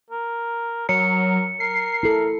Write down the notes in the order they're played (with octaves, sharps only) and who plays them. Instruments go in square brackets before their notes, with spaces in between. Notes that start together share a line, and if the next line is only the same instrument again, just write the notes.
[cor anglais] A#4
[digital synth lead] F#3 [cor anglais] A#4 [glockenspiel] C#7
[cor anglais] A#4 [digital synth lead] C7
[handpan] E4 A4